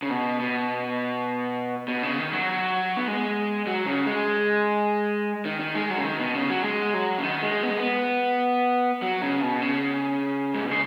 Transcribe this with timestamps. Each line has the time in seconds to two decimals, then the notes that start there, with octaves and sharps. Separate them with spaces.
0.02 C#3
0.10 B2
0.40 B2
1.88 B2
2.03 C#3
2.18 D#3
2.33 F#3
2.97 B3
3.08 G#3
3.67 F#3
3.86 C#3
4.06 G#3
5.45 D#3
5.60 D#3
5.75 G#3
5.90 F#3
5.98 C#3
6.04 D#3
6.19 B2
6.35 C#3
6.49 F#3
6.64 G#3
6.94 F#3
7.18 C#3
7.23 D#3
7.43 G#3
7.63 B3
7.70 G#3
7.77 B3
9.02 F#3
9.22 C#3
9.42 B2
9.62 C#3
10.54 G#2
10.63 B2
10.71 C#3